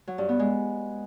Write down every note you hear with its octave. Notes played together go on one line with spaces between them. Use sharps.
F#3
G2
B3
G#3